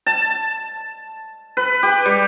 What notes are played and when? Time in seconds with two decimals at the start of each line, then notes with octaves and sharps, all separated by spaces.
0.06 A5
1.57 B4
1.83 G4
2.06 G3